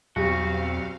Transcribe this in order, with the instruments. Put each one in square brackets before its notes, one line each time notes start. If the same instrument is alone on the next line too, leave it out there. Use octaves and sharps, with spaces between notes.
[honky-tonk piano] B1 G3 [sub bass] E2 [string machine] C4 F5 [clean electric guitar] F#4